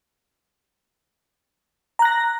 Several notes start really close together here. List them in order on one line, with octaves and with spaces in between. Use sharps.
A#5 F#6 A#6